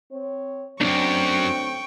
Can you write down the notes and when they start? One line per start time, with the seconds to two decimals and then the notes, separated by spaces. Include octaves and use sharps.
0.11 C4 C#5
0.81 C#2 F#2 F#3 A3 C4 D4 G5 C#6